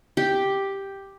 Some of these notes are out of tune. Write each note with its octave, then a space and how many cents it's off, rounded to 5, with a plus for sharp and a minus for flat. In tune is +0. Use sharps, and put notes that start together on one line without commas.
G4 +0